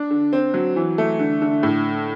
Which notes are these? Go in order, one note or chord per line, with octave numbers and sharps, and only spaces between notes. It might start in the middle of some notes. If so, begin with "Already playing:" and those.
Already playing: D4
D3
C4
F#3
E3
A3
D3
D3
A2